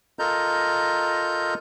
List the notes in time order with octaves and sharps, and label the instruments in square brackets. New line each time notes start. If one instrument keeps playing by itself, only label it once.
[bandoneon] F4 A4 A#4 D#5 A#5 G6